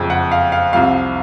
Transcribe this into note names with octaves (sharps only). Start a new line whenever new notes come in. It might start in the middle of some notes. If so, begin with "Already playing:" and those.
Already playing: F#1 F2 C#3
F#5
F5
F5
C2 C3 F3 C4 F5